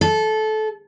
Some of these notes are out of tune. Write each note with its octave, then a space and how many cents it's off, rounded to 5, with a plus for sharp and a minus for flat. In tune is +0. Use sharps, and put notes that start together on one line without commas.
A4 -20